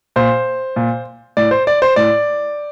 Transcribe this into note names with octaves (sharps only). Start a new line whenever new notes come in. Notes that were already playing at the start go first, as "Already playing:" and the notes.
A#2 C5
A#2
A2 D5
C5
D5
C5
A2 D5